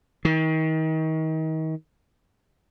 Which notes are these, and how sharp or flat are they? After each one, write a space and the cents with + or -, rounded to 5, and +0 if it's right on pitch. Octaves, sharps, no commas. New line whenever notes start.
D#3 +35